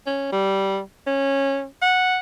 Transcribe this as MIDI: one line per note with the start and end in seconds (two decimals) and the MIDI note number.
0.06 0.31 61
0.32 0.80 55
1.07 1.66 61
1.82 2.19 78